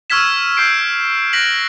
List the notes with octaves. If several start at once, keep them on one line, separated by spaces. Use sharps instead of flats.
C#6 E6 F6 G#6 B6 E7
C#6 G6 C7 D7
F#6 A#6 B6 D7 F#7